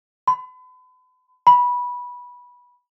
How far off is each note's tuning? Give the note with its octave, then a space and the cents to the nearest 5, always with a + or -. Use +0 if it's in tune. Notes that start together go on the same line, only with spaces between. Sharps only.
B5 +40
B5 -15